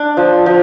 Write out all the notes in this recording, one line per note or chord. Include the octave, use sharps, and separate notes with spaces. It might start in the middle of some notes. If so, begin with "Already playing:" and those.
Already playing: D4
F3
F3